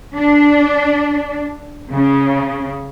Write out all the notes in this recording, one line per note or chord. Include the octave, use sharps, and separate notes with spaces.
D4
C#3